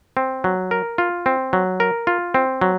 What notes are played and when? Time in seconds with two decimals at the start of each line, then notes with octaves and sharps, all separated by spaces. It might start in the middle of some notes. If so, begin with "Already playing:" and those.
0.17 C4
0.44 F#3
0.71 A#4
0.98 F4
1.26 C4
1.53 F#3
1.80 A#4
2.07 F4
2.34 C4
2.61 F#3